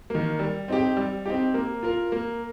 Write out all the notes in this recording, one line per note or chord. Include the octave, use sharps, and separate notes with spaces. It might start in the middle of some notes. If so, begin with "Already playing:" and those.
D#3 A#3
G3
C4 D#4 G4
G3
C4 D#4 G4
A#3
F4 A#4
A#3